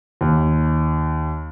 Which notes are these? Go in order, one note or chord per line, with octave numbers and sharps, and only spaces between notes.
D#2